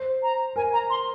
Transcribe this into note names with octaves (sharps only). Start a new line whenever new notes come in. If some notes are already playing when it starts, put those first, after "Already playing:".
Already playing: C5
A#5
A#4 G#5
A#5
C6